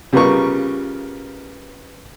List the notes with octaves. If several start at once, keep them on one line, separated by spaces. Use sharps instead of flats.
C#3 G3 B3 F4 A#4 C#6